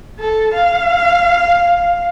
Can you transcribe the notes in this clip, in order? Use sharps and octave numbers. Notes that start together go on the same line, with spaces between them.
A4
F5